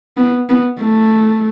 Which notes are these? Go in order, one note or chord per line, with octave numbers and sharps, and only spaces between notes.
B3
B3
A3